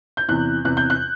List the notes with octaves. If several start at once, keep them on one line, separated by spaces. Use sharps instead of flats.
G6
E2 C3 E3 F#6
E2 C3 E3 F#6
G6
F#6